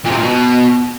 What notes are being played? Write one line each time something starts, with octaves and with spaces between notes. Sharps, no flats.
A#2
C3
A#2
B2